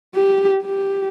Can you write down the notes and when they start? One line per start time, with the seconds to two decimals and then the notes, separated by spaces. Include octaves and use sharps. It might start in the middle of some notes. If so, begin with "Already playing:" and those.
0.15 G4
0.63 G4